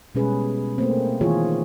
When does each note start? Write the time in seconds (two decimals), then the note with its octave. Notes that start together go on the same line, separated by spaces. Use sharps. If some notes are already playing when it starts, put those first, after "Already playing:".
0.15 B2 G3 G#3 C#4 G#4 B4
0.78 A3 A#3 C4
1.21 D#3 E3 F4 G#4 C#5